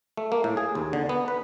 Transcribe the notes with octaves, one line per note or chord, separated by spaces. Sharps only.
A3
A#3
A2
G#4
D#2
D3
B3
B4